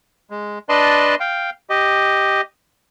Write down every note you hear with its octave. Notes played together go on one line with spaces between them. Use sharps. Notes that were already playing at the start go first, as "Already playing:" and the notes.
G#3
D4 B4 D5 D#5 A5 C6
F5 G5
G4 D#5